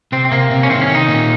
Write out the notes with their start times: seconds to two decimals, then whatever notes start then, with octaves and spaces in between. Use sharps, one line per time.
0.12 C3 C4
0.25 C4
0.32 C3 A#3
0.51 C3
0.63 C#4
0.70 D#3 C4
0.82 C#4
0.88 D#3
0.95 D#4
1.08 A#2